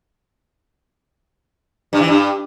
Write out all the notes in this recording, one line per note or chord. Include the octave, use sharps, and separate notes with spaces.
G2
E3
G2